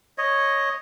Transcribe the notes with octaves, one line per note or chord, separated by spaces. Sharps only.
C#5 D#5